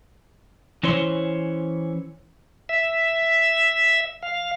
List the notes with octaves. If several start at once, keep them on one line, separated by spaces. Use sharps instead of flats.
E3 C#4 E4 C5 C#5 C6
E5
F5